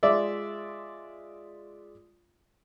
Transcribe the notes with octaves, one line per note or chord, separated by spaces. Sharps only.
G#3 F4 D5 E5